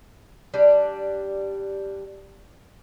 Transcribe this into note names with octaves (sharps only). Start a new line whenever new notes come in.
G3 D4